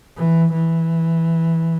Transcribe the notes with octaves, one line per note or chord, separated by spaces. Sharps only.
E3
E3